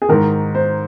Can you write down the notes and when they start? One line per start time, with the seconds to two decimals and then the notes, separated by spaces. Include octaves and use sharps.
0.02 G#4
0.09 G#2 D#3 A#4
0.55 C5